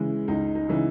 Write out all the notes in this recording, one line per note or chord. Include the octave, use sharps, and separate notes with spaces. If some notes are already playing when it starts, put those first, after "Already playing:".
Already playing: C#3 E3 G#3
C#2 D#4
D#4
C#3 E3 G#3